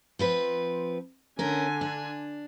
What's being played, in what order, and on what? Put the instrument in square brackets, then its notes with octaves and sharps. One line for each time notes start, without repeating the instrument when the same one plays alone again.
[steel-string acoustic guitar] F3 C4 B4
[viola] D3 G#5 [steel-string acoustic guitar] C#4 A#4
[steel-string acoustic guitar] D4